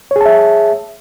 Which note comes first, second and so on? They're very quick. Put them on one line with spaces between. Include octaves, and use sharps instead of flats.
C#5 G#4 A5 E5